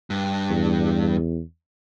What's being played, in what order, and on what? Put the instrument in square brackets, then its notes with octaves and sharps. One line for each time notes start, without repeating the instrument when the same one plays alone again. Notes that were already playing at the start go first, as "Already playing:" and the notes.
[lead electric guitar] G2
[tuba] E2